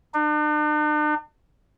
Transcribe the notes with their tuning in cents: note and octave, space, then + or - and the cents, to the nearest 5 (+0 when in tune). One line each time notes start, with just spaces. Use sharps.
D4 +45